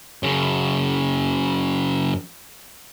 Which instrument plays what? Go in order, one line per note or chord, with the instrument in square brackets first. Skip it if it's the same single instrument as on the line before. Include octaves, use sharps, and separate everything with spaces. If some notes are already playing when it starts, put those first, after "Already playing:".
[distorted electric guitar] F#2 C#3